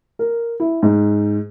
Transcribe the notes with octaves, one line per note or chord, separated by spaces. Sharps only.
A#4
E4
G#2